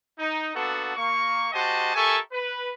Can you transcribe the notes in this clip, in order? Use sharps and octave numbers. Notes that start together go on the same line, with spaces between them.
D#4
A#3 B3 D4 F#4 A4
A#3 C#6
G#3 F#4 G4 C5 D#5 A5
G4 A4 A#4 E5 G#5 C#6
B4